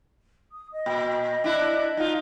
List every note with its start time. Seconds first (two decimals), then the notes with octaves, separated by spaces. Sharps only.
0.52 D#6
0.73 D#5
0.86 A#2
1.44 D4 E4
1.97 D#4 F4